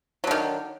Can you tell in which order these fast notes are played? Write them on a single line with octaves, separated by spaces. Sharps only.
F#3 D3 D#3